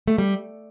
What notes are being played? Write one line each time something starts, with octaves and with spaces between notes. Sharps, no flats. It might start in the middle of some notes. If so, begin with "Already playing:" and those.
A3
G3